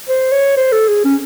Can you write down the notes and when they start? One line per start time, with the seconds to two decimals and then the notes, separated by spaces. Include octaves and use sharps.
0.09 C5
0.32 C#5
0.57 C5
0.72 A4
0.89 G#4
1.05 C#4